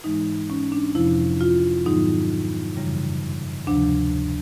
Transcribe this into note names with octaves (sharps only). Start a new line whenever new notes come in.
G#2 E3 G#3 D#4
C#4
D4
F2 C3 F3 E4
F4
G#2 D#3 F#3 B3 D#4
F#2 C#3 E3 G3
D2 C3 F3 D4